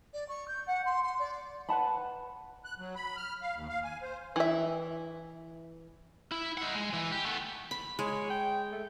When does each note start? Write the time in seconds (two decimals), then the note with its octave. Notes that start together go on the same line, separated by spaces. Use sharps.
0.14 D5
0.29 C#6
0.48 G6
0.67 F#5
0.85 C6
1.03 C6
1.19 D5
1.69 B4 F#5 A5 B5
2.65 F#6
2.78 F#3
2.96 B5
3.17 F6
3.42 F5
3.56 D#2
3.69 F5
3.84 G#5
4.02 C5
4.36 E3 E5
6.32 E4
6.58 D#4 F#5
6.75 G#3
6.93 E3
7.12 G4
7.25 A3 B3
7.71 B5
7.99 G#3 C#5
8.30 G5
8.72 A3